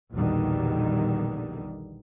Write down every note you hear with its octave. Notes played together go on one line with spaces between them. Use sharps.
A#1 E2 B2 D3 D#3 G3